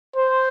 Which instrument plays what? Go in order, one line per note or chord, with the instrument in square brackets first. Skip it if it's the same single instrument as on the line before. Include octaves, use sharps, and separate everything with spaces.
[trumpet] C5